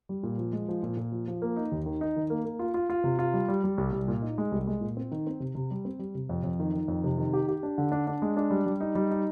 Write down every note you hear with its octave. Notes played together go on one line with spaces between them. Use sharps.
G3
A#2
F3
G#3
F3
A#2
A#2
F3
F3
A#3
D#4
D#2
D#3
D#4
D#3
A#3
A#3
F4
F4
F4
C3
F4
G3
G3
G3
C2
C2
A#2
D#4
G#3
C2
G#3
A#2
C4
D#3
C4
C3
C3
G3
C4
G3
C3
F2
F2
D#3
D#3
F2
C3
D#3
G4
G4
D4
D3
D4
D4
G#3
D4
G3
G3
D#4
G3
D#4